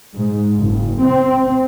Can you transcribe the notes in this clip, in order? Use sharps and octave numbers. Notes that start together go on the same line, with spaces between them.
G#2
F#1
C4